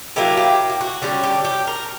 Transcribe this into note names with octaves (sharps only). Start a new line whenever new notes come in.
F#3 A#3 E4 G4
G4
G4
F#4
D3 G3 C#4 F#4
G4
G4
A#4